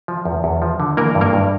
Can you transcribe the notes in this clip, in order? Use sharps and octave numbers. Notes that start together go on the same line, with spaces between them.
F3
E2
E2
F3
D3
E3 A#3 A#4
G2
A#3 A#4
G2